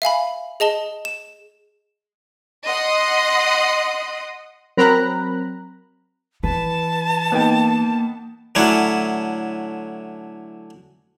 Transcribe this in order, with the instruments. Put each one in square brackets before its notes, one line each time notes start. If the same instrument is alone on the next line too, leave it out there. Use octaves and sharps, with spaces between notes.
[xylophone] E5 F5 G#5 B5
G#4 D#5 A5 G7
E7
[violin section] D#5 F#5 C6 D#6
[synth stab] F#3 C4 A#4 A#5 B5 F#6
[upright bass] E3 [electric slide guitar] B4 [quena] A5
[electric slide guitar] A#3 [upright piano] B3 D#4 G5
[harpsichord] D3 F#3 A3 C#4 D4 E4